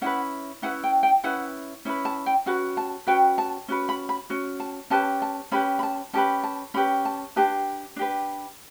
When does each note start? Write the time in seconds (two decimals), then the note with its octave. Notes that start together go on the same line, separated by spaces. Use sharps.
0.02 C#4 E4 B4 F#5
0.62 C#4 E4 B4 F#5
0.84 G5
1.03 G5
1.24 C#4 E4 B4 F#5
1.85 C#4 E4 B4
2.05 A5
2.26 G5
2.46 C#4 F#4 B4 F#5
2.77 A5
3.07 C#4 F#4 B4 G5
3.38 A5
3.68 C#4 F#4 B4
3.89 B5
4.09 B5
4.30 C#4 F#4
4.60 A5
4.90 C#4 G4 B4 A5
5.22 A5
5.52 C#4 G4 B4 B5
5.79 B5
5.83 A5
6.13 C#4 G4 B4 A5
6.44 A5
6.74 C#4 G4 B4 B5
7.05 A5
7.36 D4 G4 B4 A5
7.96 D4 G4 B4